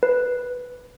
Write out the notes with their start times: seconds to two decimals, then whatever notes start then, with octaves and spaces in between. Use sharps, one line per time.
0.03 B4